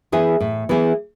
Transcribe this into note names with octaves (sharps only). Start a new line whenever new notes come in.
E3 B3 E4 G#4
A2
E3 B3 E4 G#4